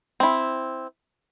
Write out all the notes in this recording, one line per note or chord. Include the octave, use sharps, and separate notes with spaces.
C4 E4